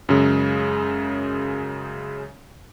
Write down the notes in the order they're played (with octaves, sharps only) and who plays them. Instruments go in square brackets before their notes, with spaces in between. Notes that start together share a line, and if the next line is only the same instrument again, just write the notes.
[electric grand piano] F#2 C#3 G#3